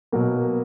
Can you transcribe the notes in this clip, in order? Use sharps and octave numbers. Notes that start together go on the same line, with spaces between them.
B2 F#3 A#3